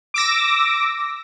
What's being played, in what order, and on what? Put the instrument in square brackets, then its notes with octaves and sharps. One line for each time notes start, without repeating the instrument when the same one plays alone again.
[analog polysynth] D6 E6 A#6